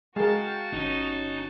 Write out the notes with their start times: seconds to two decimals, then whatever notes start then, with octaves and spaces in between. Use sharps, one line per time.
0.16 G#3 F#4 G#4 A#4 F5 G5 A5
0.73 G1 C#4 D#4